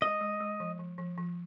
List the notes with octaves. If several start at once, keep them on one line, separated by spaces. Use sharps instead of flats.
G#3 D#5
G#3
G#3
F3
F3
F3
F3